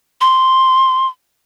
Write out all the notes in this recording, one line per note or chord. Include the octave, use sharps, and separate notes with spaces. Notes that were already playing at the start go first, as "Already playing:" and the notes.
C6